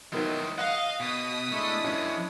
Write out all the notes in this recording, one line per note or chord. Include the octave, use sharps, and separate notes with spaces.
B2 D#3 F#3 G#3 E4
D#5 F5 F#5
B2 D#6 B6
G#3 A3 D4 E4
F#2 A#2 C#4